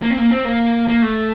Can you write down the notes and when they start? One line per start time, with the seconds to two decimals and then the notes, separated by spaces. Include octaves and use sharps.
0.02 A#3
0.10 C4
0.18 A#3
0.30 C4
0.45 A#3
0.88 A#3
1.02 A3